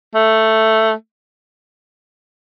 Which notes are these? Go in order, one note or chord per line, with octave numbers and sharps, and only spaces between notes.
A3